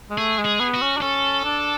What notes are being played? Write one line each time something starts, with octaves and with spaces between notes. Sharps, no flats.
G#3
A3 G#4
G#3
G#4
B3
F#4
C#4
D4
C#4 A4
D4